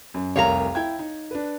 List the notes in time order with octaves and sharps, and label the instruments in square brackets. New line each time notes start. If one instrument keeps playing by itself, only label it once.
[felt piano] F#2
[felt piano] F1 C2 A#4 [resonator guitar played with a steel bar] C#5 F5 A#5
[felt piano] E4 G5 G#6
D#4
D4 B4